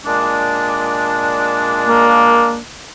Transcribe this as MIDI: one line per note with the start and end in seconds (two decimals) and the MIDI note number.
0.05 2.59 46
0.05 2.59 56
0.05 2.59 62
1.88 2.59 58